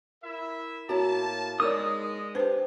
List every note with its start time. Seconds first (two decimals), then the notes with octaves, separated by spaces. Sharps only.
0.23 E4 A#4 E5
0.89 A2 A#3 E4 F#4 C#5 A5 A#5
1.60 G#3 D#4 A#4 C#5 D5 D#6
2.35 D4 G4 B4 C5